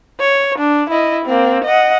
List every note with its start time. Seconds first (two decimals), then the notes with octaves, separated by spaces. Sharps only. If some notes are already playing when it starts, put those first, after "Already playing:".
0.20 C#5
0.59 D4
0.90 E4 D#5
1.25 A#3 C4
1.65 D#5 F#5